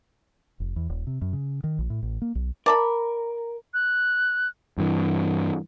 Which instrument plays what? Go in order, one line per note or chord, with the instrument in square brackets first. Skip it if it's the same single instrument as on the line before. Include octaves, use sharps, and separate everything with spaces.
[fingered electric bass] F1
E2
D#1
C3
F#2
C#3
D#3
A#1
A2
A1
A#3
B1
[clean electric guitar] A#4 [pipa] D5 A5 B5
[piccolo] F#6
[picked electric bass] G2 E3